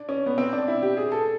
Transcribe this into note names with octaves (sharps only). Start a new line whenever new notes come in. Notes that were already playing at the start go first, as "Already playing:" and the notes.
Already playing: D4
C#4
B3
C4
D4
E4
G4
G#4
A4